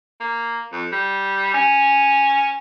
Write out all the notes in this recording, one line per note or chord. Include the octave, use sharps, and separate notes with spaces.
A#3
F2
G3
C#4